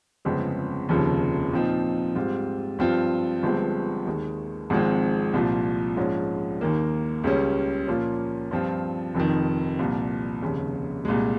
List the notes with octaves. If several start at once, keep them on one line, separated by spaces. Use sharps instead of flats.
G1 F2 C#3 G#3 C4
F1 D#2 C#3 F3
A#2 F3 C4 D#4
G#2 G3 C4 F4
G2 F3 C4 F4
G1 G2 F3 G#3 C4
D#2 D#3 G#3
G#1 G#2 F3 G#3 C4
C2 A#2 F3
A#1 G#2 F3 G#3 C#4
D#2 D#3 A#3
C#2 C#3 G3 C#4
A#2 F3 A#3 C#4 F4
G2 F3 C4 F4
F1 F2 D#3
C2 A#2 F3
F1 D#2 C#3
C2 A#2 G#3